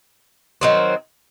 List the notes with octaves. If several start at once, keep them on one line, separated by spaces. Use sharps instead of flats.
D#3 F#3 C4